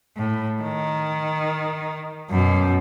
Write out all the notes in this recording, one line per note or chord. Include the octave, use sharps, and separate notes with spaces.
A2
D#3
F#2 B2